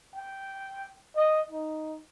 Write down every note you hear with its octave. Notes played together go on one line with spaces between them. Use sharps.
G5
D#5
D#4